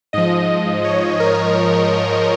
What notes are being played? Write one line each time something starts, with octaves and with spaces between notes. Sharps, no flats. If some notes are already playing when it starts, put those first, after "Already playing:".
G#2 F3 D#5
D#5
C#5
A#4